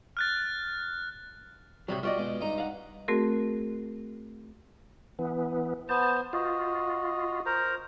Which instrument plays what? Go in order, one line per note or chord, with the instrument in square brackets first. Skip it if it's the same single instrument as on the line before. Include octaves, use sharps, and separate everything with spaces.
[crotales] F6 F#6 A6
[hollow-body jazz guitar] A2 C3 F#3 [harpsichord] G3 B5
[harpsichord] G3 F#4 [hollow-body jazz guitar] F4 D5 D#5
[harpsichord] B2 G#3
G2 D#4 A#5
[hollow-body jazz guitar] F5 F#5
[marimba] A3 C4 F#4 G#4 A#4
[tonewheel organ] E3 B3
[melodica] B3 C5 [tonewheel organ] A5
[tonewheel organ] F4 [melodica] F#4 D#5
[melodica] A#4 C5 A#5